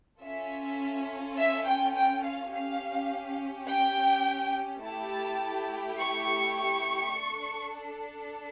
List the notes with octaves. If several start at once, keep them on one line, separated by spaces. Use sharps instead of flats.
C#4 F4 A4 E5
E5
G5
G5
F5
C#4 G4 F5
G5
A3 E4 G4 A5
C#6
D4 A4